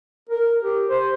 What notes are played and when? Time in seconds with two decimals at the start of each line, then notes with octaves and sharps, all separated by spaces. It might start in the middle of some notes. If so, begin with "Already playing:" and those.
0.30 A#4
0.63 G4
0.89 C5